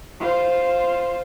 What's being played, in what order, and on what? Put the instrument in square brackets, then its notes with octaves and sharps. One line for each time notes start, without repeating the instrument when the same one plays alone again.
[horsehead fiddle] F4 C5